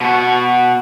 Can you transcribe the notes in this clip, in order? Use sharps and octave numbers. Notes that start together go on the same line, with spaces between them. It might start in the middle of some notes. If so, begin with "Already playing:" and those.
B2 F#4